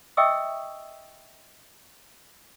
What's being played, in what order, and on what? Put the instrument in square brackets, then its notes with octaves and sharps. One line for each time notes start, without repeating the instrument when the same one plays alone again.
[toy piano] D#5 E5 G5 C#6 D#6 E6